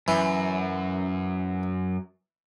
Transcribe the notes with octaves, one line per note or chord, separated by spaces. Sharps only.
F#2 E3